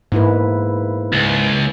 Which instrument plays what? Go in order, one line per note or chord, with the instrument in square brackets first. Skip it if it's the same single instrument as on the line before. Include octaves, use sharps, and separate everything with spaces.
[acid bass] G#2 [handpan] A#3 E4 B4
[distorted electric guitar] C#2